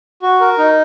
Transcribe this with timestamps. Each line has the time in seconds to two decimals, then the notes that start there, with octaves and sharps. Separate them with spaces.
0.22 F#4
0.40 A#4
0.58 D#4